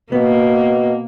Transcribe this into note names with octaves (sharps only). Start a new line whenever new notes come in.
B2 A#3 B3